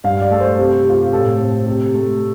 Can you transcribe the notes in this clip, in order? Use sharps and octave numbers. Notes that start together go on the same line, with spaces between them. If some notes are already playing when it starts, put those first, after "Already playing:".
G2 F5
D5
A3 A4
C5
C3 G4
C3 F4
G4
A2 A4
C4
C3
A3